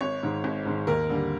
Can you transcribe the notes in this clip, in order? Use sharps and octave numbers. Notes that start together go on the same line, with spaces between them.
G#1 C#5
G#2 D#3
G#1
G#2 D#3
D#2 A#4
D3 G3 A#3